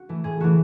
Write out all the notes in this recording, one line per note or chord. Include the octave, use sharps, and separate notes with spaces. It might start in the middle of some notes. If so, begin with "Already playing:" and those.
Already playing: F#4
E3 A3
A2 G#4
E3 A3 F#4